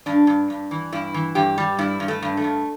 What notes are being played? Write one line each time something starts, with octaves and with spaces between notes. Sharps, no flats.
G2 D4
G2
G2
E3
G2 E4
E3
G2 G4
G3
G2 E4
G2
A3
G2
A3
G2